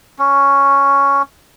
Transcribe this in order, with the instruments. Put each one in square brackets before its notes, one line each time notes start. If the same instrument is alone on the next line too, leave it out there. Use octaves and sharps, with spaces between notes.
[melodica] C#4